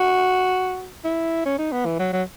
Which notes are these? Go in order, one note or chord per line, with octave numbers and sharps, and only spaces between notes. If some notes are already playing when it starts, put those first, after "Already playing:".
Already playing: F#4
E4
C#4
D#4
B3
E3
F#3
F#3